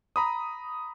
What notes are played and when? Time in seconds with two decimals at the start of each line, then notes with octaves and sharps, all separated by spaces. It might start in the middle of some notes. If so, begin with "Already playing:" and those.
0.16 A#5 B5 D#6